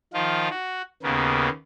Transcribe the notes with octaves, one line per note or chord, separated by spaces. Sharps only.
D#3 F3 F4
F#4
D#2 C#3 A#3 B3